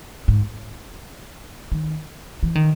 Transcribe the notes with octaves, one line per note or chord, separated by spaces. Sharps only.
G#2
D#3
E3
D#3